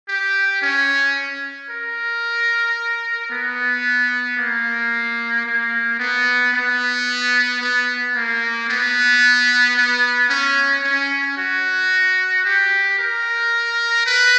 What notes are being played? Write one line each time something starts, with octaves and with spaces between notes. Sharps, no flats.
G4
C#4
A#4
B3
A#3
A#3
B3
B3
B3
A#3
B3
B3
C#4
C#4
F#4
G4
A#4
B4